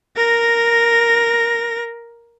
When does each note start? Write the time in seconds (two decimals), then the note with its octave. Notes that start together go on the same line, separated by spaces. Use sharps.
0.17 A#4 A#6